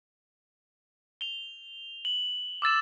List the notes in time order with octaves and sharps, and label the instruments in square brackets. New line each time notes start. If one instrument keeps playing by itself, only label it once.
[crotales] F7 G7
F#7
D6 E6 A6 E7